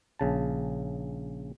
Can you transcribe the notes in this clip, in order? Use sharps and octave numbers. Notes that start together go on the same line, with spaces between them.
A#1 C#3 A5